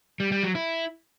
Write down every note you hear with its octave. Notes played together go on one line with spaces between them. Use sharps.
G3
G3
F#3
E4